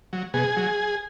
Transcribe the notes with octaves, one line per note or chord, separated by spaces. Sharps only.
F#3
B2 G#4
F#3